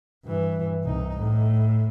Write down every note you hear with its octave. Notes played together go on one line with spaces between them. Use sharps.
G2 E3
C2 D#4
A2